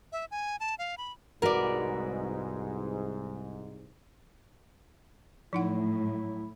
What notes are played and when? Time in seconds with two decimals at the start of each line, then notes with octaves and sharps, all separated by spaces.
0.12 E5
0.31 G#5
0.60 A5
0.79 F5
0.98 B5
1.42 C2 G#2 F#4 A#4 B4 D5
5.53 A2 F3 F#3 D#4 E4 F#5